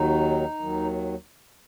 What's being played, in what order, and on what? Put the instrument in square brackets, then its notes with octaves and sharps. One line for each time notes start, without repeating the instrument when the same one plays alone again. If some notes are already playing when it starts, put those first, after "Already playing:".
Already playing: [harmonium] D#2 D#3 F#3 D#4
D#2 D#3 F#3